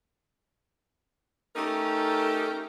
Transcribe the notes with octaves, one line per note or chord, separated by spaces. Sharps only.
A3 C#4 D#4 G4 A4 A#4